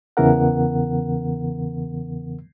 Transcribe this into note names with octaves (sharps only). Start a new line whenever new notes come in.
E2 C#3 E3 B3 A#4 F#5